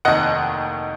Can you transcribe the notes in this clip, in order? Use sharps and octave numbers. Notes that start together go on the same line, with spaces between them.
F1 D#2 D#3 D#5 F#5